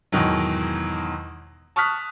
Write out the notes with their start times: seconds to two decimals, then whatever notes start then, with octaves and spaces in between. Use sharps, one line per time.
0.12 E2 G#2 B2 D#3 F#3
1.76 A5 C#6 D#6 F6 F#6 B6